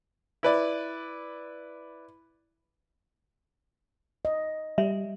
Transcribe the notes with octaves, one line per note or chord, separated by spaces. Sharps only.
E4 B4 D5
D#5
G3 E5